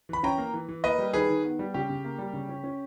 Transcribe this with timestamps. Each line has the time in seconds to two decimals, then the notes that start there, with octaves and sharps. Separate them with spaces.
0.09 E3 B5
0.23 C#4 G5 A#5
0.38 A#3
0.54 E3
0.68 E3
0.84 A#3 B4 D#5
0.98 G3
1.13 D#3 G#4 B4
1.29 D#3
1.44 B3
1.59 G3
1.74 C#3 G4
1.90 C#3
2.05 A#3
2.19 G3
2.33 C#3
2.49 C#4
2.64 C#4